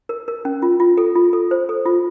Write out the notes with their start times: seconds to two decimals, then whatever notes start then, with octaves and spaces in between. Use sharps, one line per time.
0.09 A#4
0.28 A#4
0.45 C#4
0.62 F4
0.80 F4
0.97 A4
1.15 F4
1.33 A4
1.51 C5
1.69 A4
1.85 F4